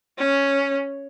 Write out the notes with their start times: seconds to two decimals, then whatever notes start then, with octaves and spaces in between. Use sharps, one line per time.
0.18 C#4